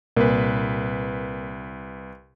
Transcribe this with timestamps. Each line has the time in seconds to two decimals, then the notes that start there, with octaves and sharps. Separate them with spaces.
0.17 C2 A#2 B4